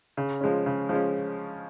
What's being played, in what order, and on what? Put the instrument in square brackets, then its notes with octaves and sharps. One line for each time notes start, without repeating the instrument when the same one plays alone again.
[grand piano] C#3
F3 G#3 C#4
C#3
F3 G#3 C#4